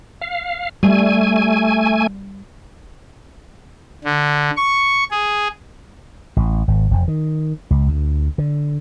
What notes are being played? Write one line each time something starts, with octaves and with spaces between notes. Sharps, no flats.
F5
G3 A3 G#5
D3
C#6
G#4
A1
G#1
F1
D#3
C#2
D2
D3